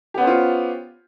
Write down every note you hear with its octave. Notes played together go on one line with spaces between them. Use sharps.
B3 C#4 F4 G4 C5